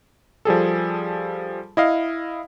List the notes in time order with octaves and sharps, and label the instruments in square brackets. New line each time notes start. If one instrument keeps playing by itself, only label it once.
[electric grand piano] F3 G3 G#4 A4
E4 D#5 F5